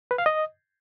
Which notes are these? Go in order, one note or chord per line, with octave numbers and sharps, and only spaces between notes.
B4
F5
D#5